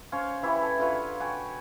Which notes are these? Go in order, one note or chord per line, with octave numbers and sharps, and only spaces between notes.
C#4 C5 C#5 F5
E3 E4 G4 B5
A4
D3 F4 B4 C#5
F#4 G5 G#5